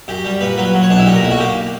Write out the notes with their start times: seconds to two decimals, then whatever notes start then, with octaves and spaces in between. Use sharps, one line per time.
0.08 F#2 G4
0.25 G3
0.41 A#2 B4
0.57 F#3 B4
0.74 F#3
0.82 C#5
0.90 B1 D4
0.98 E4
1.06 A#2 G4
1.14 A#4
1.23 B1 E4
1.31 F#4
1.39 A#3 G4